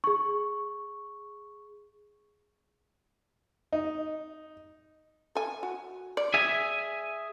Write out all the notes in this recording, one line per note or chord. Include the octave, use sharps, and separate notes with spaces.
G#4 C#6
D#4
A4 G#5
F#4
D5
G#4 E5 G#5